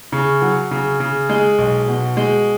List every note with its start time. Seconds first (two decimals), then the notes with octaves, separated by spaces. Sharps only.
0.12 C#3
0.42 F#3
0.71 C#3
1.00 C#3
1.29 G#3
1.58 B1
1.88 B2
2.17 G#3